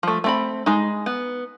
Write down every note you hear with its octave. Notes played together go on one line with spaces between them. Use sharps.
F3 A3
A3 C4 B5
G#3 D#4
B3